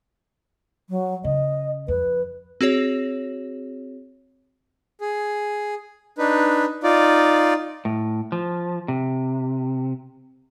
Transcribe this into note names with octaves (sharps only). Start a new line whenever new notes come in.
F#3
C#3 D#5
F2 B4
C4 F#4 G#4 C#5
G#4
D4 D#4 B4
D#4 F4 D5
A2
F3
C3